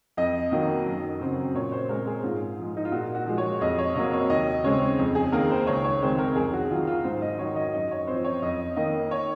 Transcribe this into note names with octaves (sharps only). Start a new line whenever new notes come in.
F2 D#5
D#3 F#3 A#3
F#2
C#3 F#3 C4
A#2 C#5
C5
G#3 C4 A#4
G#4
G#2 F4
F3 G#3
D#4
F4
A#2 F#4
F#4
F3 G#3
C#5
F2 D#5
C#5
C3 F#3 A#3 D#5
C#5
D#2 D#5
C#3 G#3 C4 C#5
F2
G#4
D#3 A#3 A#4
C5
C#2 C#5
C#5
C3 D#3 G#3 C4 C5
A#4
F2 G#4
F#4
D#3 F#3 F4
F4
G#2 C5
D#5
D#3 F#3 C#5
D#5
F#2 D#5
C#5
F3 C4 C5
C#5
F2 D#5
D#3 A#3 D#5
C#5